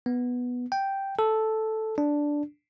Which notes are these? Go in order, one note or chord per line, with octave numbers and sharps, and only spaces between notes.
B3
G5
A4
D4